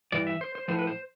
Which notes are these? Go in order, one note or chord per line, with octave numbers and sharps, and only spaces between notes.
G2 E3 D5
E5
C5
C5
A2 F3 C5
B4
C5